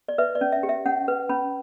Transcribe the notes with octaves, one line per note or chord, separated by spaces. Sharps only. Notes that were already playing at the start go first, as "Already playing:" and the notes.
D5
B4 E5
D5
C#4
E5
G4
E5
C#4 F#5
B4
C#4 B5